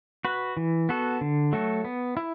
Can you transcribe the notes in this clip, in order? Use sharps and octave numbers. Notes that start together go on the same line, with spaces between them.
F#4 B4
E3
B3 F#4 A4
D3
F#3 A3 F#4 A4
B3
E4